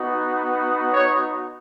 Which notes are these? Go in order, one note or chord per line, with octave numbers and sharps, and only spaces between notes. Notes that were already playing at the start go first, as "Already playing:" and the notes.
Already playing: B3 D#4 F#4
C#5